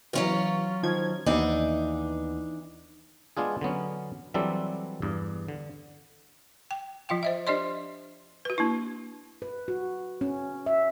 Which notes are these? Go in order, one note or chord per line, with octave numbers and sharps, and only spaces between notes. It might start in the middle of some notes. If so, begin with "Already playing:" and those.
E3 F#3 C#4 F4
D#3 F3 G#6
D#2 E3 B3 D4 D#4
G#3 B3 D4 F4 G#4
D3 F#3 B3 C#4
E3 F#3 G3 C4 D4 A4
E2 G2
D3
G5
F3 F4 F5 G5
C5 D#5 E5
D4 G4 C5 D5 D#5 C6
F#4 B4
A#3 D4 E4
B4
F#4
C#4
E5